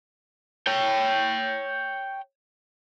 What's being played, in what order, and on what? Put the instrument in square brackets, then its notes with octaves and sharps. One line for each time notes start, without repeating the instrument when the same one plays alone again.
[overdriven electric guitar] C#5 G5